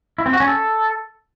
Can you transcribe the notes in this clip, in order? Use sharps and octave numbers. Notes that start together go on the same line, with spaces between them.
E4
C4
F#4
C#4
A4